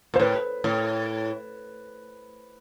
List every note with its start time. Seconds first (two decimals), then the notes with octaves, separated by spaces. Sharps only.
0.14 A#2 C5
0.20 A2 B4
0.64 A2